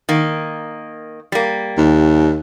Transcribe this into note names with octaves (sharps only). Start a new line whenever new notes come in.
D#3 A#3
G3 A#3
D#2